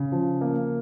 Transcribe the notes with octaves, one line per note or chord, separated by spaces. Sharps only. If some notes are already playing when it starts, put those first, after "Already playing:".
Already playing: C#3
F3
A#3